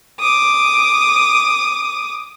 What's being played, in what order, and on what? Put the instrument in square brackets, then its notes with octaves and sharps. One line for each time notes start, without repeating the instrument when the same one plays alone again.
[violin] D6 D#6